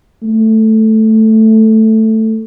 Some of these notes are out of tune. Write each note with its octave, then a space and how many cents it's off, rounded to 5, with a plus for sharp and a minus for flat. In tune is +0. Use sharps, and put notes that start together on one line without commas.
A3 +0